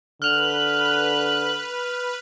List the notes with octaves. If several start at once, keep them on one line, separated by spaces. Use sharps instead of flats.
D3 B4 F6 F#6 F7